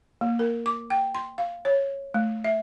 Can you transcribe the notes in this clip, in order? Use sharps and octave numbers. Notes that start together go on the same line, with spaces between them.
A#3
A#4
D6
G5
C6
F5
C#5
A3
E5